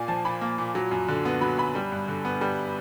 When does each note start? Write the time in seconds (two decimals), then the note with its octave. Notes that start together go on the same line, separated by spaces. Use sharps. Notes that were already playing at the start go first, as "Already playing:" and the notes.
Already playing: A#2 A#3 D5 G#5
0.08 F3 A5
0.25 A#2 B5
0.41 A#3
0.58 A#2
0.75 F#3
0.91 F#2
1.08 D3
1.25 B3
1.41 F#3 B5
1.58 F#2 B5
1.75 G3
1.92 G2
2.08 D3
2.25 B3
2.41 G3